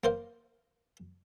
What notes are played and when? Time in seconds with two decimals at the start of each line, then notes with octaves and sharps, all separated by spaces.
0.04 A#3 C5 F5